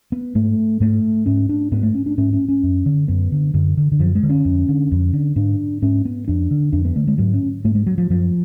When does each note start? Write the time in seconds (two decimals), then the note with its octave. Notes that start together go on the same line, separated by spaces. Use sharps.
0.12 B3
0.35 G#2 A3
0.80 G#2 A3
1.26 G#2 C#4
1.49 D4
1.72 G#2 B3
1.83 A3
1.95 C#4
2.06 D4
2.18 G#2 C#4
2.33 C#4
2.48 C#4
2.63 F#2
2.86 D3
3.08 F#2 B3
3.32 D3
3.54 F#2 D3
3.77 D3
3.92 D3
3.99 F#2 F3
4.15 G#3
4.23 D3
4.29 C#4
4.45 F2
4.69 D3
4.91 F2
5.13 D3
5.36 G#2 D4
5.82 G#2 C#4
6.05 B3
6.28 F2 D4
6.51 D3
6.73 F2 D4
6.85 B3
6.96 D3 A3
7.07 G#3
7.18 G#2 F#3
7.34 C#4
7.64 G#2 A3
7.75 G#3
7.87 F#3
7.98 F3
8.10 F#2 F3